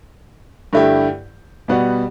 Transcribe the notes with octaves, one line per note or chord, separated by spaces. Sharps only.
G2 D3 A3 E4 G4
B2 G3 B3 F#4